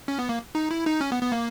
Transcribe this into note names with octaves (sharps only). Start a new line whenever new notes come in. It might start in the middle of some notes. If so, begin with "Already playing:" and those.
C#4
B3
A#3
D#4
E4
D#4
C#4
B3
B3
A#3